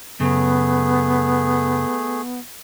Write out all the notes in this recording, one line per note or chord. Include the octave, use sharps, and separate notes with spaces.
F#2 C#3 A3 B3 G#4